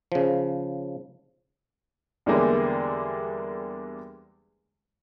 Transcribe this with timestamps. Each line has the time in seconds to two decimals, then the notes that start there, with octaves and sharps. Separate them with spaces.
0.12 C#3 F3
2.26 E2 D3 E3 G3 G#3 A#3